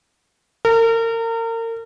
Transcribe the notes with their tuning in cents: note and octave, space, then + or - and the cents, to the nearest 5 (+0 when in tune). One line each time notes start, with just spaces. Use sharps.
A#4 -35